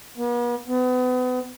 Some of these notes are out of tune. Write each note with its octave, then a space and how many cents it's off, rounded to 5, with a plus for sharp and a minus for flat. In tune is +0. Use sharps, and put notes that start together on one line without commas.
B3 -45
B3 +35